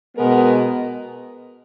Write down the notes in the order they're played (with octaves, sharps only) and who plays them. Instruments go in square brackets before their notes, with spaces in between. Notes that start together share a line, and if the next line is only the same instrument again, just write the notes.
[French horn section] B2 G#3 B3 A#4